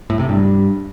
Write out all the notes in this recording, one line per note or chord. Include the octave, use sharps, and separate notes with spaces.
A2
C3
G2